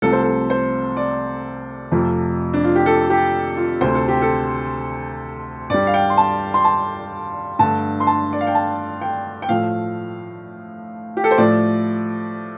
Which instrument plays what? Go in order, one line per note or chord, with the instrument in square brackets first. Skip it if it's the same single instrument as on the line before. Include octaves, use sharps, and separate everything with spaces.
[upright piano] C2 C3 F3 A3 A4
C5
A4
C5
D5
F2 C3 F3 A3
D4
F4
G4
A4
G4
F4
D2 C3 A3 C5
A4
G4
A4
G2 G3 D5
F5
G5
C6
A5
C6
A5
G2 D3 A3 A5
C6
A5
D5
F5
G5
A5
G5
G5
A2 F3 A3 F5
G4
A4
C5
A2 F3 A3 D5